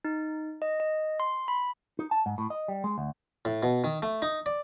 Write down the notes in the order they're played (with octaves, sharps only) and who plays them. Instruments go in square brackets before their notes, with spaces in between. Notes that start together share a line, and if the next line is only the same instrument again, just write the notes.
[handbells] D#4
D#5
D#5
C6
B5
[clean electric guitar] D#4
A5
G#2
A2
D#5
G3
G#3
D2
[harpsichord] A2
B2
D#3
A3
D#4
D5